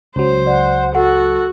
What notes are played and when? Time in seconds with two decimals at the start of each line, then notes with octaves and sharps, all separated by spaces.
0.16 C#2 F#3 C5
0.47 D5 F#5
0.95 F#4 A4 F#5